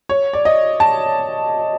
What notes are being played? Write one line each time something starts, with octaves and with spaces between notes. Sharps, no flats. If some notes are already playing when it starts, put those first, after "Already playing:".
C#5
D5
D#5
A5